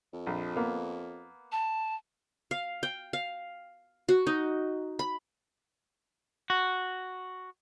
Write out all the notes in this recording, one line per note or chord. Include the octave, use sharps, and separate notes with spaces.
F2
A#1
A#3 B3
A5
F5
G5
F5
F#4
D#4
B5
F#4